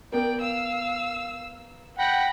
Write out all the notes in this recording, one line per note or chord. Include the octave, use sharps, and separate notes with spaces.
B3 A#4 D5 G5
F5 E6
F#5 G5 B5 A#6